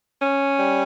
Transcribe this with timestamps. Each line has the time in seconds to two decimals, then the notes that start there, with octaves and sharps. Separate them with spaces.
0.21 C#4
0.59 G3